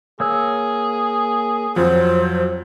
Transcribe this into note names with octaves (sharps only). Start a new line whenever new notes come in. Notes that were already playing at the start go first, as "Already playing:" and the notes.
A#3 G#4 C#5 E6
F2 F#3 C5